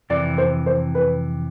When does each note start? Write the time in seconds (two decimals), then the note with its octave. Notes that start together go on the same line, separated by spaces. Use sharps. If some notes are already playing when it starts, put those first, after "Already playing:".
0.10 F2 C3 E3 D5
0.38 C5
0.66 C5
0.95 B4